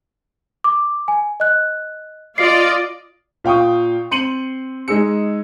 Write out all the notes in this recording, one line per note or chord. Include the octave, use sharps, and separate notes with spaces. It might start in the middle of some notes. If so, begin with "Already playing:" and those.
D6
G#5
D#5 F#6
F4 D5 D#5 C7
A#2 F5 G5 C#6 D#6
C4 C6 C#7 D#7 F#7
G#3 D#4 G#4 E6 C#7